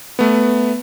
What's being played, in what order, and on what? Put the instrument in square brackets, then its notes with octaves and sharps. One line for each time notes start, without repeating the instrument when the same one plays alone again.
[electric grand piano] A3 B3